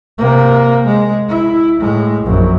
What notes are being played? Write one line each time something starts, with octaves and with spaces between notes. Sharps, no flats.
C3 A#3
G#3
E4
A2 G#3
A#1 F#2